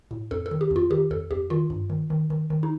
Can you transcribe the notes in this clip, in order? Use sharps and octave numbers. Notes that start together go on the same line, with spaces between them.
A2
F2 A4
A4
D#3
G4
F2 F4
D#3 G4
F2 A4
F2 G4
D#3 F4
G2
D#3
D#3
D#3
D#3
D#4